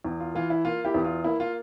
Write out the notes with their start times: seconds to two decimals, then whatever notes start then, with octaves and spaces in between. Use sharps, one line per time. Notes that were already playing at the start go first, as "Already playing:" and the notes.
0.05 E2
0.20 F4
0.35 E3 F4
0.50 E4
0.65 A#3 F4
0.85 E4 G4
0.94 E2
1.04 F4
1.24 A#3 E4
1.40 F4